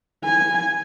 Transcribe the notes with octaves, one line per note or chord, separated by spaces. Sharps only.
G#5